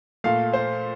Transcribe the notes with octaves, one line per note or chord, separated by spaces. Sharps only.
A#2 A3 F5
C5